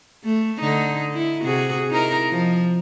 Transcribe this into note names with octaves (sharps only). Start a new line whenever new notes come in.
A3
D3 D#4
E4
C3 F#4 G#4
D#4 E4 A#4
F3